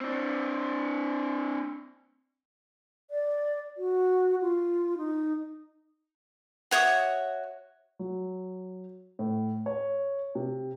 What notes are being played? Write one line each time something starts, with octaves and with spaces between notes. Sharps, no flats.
C4 D4
D5
F#4
F4
D#4
F#4 C#5 E5 D#6
F#3
A2
C#5
C3